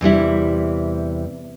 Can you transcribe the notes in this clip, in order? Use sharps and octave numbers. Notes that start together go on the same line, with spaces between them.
E2 C3 G3 E4